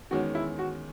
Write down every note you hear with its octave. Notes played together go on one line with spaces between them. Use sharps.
E2 D#3 G#3 C#4 F#4
E4
F#4